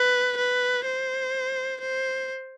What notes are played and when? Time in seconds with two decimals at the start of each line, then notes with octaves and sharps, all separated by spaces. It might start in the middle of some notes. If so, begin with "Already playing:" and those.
Already playing: B4
0.37 B4
0.85 C5
1.81 C5